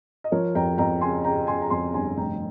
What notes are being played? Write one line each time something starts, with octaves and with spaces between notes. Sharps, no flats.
D#5
F3 A#4 C#5
F2 G5 A#5
F2 G5 A#5
C#3 G#5 C6
C#3 G5 A#5
C#3 G#5 C6
A#5
F2 G#5 C6
G1 G#5 C6
F1 G5 A#5